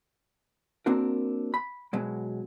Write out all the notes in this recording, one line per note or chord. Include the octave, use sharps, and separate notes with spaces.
A#3 C4 D4 F#4 A#4
B5
B2 F#3 G#3